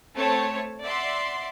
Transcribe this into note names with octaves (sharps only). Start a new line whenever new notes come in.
A3 C4 C#5 A5
D5 E5 F#5 C6